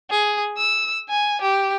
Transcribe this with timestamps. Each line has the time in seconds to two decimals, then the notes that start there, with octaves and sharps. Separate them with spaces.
0.10 G#4
0.58 E6
1.09 G#5
1.42 G4